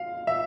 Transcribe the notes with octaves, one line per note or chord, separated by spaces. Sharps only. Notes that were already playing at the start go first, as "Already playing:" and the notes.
Already playing: F5
E5